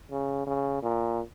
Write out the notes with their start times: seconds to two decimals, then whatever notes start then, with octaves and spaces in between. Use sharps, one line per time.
0.11 C#3
0.47 C#3
0.83 A#2